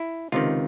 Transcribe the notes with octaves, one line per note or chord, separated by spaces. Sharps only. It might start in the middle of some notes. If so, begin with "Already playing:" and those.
Already playing: E4
C#2 C3 D#3 F4